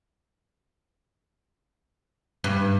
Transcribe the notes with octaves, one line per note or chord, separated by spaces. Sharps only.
G2